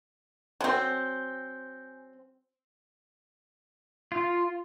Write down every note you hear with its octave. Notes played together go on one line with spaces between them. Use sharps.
F#3 C4 G#5 G6
F4